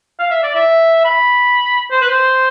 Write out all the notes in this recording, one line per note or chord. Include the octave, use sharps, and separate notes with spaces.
F5
E5
D5
E5
B5
C5
B4
C5